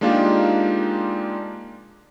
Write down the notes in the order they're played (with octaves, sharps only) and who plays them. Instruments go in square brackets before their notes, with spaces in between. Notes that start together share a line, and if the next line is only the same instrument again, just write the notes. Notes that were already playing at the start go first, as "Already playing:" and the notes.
[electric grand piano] G#3 A#3 D4 D#4 F4 G4